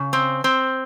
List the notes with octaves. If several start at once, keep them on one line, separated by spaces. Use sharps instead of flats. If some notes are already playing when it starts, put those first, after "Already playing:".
Already playing: C#3
C4
C4